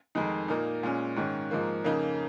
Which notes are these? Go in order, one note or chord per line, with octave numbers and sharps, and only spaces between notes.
F2 D#3 G#3 D#4
A#2 A#3 D#4
A#2 G#3 C#4
G#2 D#3 C#4
G#2 F3 A#3
F2 C#3 A#3 D#4